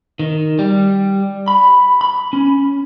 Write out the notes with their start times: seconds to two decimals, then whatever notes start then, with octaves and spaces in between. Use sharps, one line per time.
0.19 D#3
0.59 G3
1.48 B5
2.01 B5
2.33 C#4